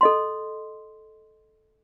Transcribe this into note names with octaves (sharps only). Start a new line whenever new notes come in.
A4 D#5 C6